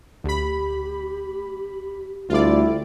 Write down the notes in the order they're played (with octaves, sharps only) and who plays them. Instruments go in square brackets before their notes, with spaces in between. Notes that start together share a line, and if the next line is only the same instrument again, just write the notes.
[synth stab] D2 B5 [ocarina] G4
[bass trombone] D2 [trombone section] G3 E4 [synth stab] F4 D5